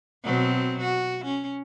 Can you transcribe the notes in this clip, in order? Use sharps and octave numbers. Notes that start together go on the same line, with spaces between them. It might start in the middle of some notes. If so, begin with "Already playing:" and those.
B2 F#3 C4
F#4
C#4